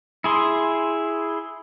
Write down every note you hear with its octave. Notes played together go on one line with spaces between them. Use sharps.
E4 G#4 C6